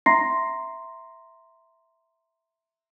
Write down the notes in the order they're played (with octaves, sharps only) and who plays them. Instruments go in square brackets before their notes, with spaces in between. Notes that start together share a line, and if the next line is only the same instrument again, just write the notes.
[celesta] E5 A#5 C6 A#6 C7